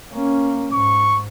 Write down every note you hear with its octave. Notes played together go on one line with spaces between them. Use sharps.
A#3 C#4
G#2 C#6